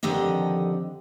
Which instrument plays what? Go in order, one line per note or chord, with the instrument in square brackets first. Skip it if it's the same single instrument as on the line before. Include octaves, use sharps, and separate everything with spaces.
[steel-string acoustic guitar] F2 D3 D#3 G4 D#5